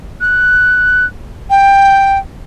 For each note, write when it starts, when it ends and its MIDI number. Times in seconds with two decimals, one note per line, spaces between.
0.21 1.05 90
1.50 2.18 79